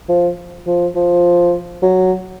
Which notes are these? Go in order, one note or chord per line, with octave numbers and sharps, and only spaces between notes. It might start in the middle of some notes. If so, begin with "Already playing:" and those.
F3
F3
F3
F#3